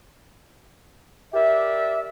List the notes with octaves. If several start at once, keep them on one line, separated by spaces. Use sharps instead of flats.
G4 A#4 D5 E5